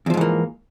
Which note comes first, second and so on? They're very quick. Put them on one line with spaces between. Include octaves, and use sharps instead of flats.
E2 F3 G#2 E3 A#3